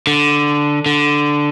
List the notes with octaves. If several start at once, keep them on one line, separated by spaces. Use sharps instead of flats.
D3
D3